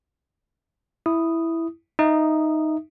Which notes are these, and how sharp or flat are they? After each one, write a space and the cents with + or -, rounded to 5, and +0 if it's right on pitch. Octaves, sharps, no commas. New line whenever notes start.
E4 +0 D#6 -5
D#4 +0 E5 +0 D#6 -15